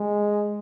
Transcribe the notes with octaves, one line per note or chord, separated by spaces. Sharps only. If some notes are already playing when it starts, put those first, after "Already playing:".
Already playing: G#3